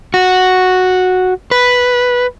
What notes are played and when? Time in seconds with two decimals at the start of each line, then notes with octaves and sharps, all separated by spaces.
0.14 F#4
1.51 B4